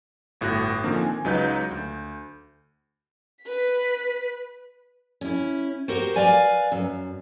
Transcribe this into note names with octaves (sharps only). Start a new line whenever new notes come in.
G1 A2 F#4 F#6 A#6
D3 D#3 F3 A#3 C4
G#5
C#2 F#3 D#4 B4 G6
D2
B4 B6
C#4 E4
F#4 G4 A#4 C5
B4 D5 F5 G#5
F#2